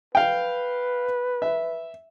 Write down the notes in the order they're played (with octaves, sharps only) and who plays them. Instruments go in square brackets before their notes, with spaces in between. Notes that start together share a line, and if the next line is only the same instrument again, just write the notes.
[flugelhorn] B4 [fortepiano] F5 G5
[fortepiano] E5